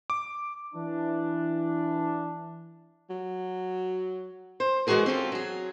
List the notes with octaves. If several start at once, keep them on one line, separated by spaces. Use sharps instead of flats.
D6
E3 D4
F#3
C5
E3 G#3 B3 F#4 G#4 A#4
C4 C#4 F4 A4
F#3 G#4